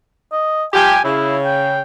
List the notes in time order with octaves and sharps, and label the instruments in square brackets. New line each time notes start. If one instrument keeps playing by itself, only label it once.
[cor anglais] D#5
[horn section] F3 G3 G4 [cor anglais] G#5
[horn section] C#3 [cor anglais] E4
[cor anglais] G5